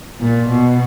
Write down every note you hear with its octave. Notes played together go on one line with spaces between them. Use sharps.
A#2
B2